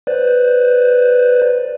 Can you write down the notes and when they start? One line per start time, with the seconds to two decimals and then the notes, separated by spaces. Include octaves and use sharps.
0.07 B4 C5 D5